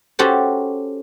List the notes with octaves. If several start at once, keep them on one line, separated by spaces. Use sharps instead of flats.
C#4 F#4 G4 A4 C5